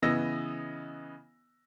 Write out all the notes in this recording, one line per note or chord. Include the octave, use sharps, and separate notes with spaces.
C#3 E3 B3 D#5 E6 A#6